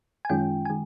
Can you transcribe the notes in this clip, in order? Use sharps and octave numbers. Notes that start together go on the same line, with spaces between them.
G#5
F#2 D#3 G#3 C#4 F4 G5
G#5
D#3 G#3